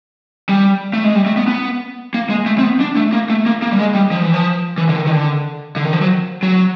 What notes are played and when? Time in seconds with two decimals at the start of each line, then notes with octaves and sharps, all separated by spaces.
0.49 G3
0.93 A3
1.04 G#3
1.15 G3
1.26 A3
1.37 B3
1.48 B3
2.14 A#3
2.30 G#3
2.46 A3
2.58 C4
2.63 B3
2.80 D4
2.97 A3
3.13 A#3
3.30 A3
3.46 A#3
3.62 A#3
3.73 G3
3.79 G#3
3.95 G3
4.11 F3
4.22 E3
4.34 F3
4.78 E3
4.89 D3
4.95 D#3
5.07 D#3
5.11 D3
5.76 D3
5.85 D#3
5.93 F3
6.01 F#3
6.43 F#3